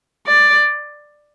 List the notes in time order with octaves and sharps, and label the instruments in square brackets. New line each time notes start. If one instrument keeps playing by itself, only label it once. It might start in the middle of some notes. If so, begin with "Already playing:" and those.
[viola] D5